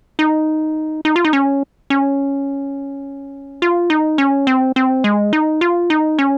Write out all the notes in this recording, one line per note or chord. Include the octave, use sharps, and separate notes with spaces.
D#4
D#4
F4
D#4
C#4
C#4
F4
D#4
C#4
C4
C4
G#3
D#4
F4
D#4
C#4